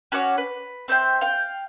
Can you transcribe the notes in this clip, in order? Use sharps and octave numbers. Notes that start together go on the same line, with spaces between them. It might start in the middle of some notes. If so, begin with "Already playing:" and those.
C#4 F#4 C#5 D6
B4
C4 C5 E5 G5
F5 G5